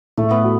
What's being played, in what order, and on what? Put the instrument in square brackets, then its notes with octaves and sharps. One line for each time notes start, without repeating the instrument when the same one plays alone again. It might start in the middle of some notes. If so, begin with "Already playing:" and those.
[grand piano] A2 [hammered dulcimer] A3
[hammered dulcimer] B3
[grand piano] F#4